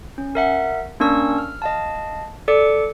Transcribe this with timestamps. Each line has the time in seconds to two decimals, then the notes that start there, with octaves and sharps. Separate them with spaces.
0.18 C#4
0.35 A#4 E5 F#5
1.00 A#3 C#4 D4 A#4 C#6 E6
1.38 F6
1.62 D#5 F5 A5
2.48 A4 D5 D6 C#7